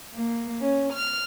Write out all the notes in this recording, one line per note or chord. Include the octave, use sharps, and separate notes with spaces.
A#3
C#4
F6